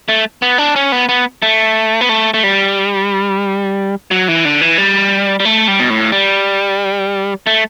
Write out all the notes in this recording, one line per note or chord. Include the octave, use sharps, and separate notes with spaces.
A3
B3
D4
C#4
B3
B3
A3
B3
A3
A3
G3
F#3
E3
D3
E3
G3
G3
A3
G3
B2
A2
G3
A3